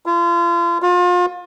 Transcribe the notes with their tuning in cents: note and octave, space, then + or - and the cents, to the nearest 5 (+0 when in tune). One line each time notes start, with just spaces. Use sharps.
F4 -35
F4 +35